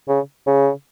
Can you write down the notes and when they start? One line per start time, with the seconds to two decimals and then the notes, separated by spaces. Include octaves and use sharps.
0.08 C#3
0.47 C#3